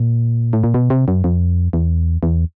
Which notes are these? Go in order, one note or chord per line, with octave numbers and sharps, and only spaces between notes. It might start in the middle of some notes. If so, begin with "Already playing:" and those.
Already playing: A#2
A2
A#2
B2
C3
F#2
F2
E2
E2